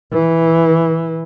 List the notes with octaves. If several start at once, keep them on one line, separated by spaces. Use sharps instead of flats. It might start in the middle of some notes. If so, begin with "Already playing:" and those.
E3